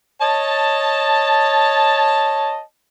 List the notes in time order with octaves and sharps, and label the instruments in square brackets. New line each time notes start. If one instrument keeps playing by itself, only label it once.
[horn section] C#5 D#5 A5